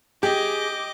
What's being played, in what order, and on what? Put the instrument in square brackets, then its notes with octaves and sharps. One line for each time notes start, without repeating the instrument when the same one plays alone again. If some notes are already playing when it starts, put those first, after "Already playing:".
[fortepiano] G4 [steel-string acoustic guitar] G#4 [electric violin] D#5 D6